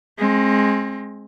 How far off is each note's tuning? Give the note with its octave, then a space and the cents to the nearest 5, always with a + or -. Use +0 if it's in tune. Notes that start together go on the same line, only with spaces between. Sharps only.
G#3 +15 C4 +35